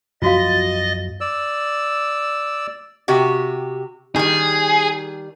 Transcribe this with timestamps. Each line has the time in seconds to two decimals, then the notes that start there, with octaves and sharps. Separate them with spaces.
0.22 F#2 F3 B3 F4 F#4 D#5 F5 A6
1.21 D5 E6
3.08 C3 F#4 G4
4.16 D#3 G3 G#4